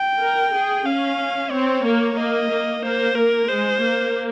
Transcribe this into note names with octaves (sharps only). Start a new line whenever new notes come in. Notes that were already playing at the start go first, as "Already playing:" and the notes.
Already playing: G5
A#4
G#4
C#4 F5
C4 C#5
A#3
A#3 D#5
A#3
A#3 C5
A#3 A#4
G#3 C5
A#3